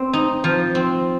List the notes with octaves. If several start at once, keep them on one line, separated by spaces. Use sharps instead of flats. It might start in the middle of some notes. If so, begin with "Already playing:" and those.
Already playing: C4
D#4
F3
C4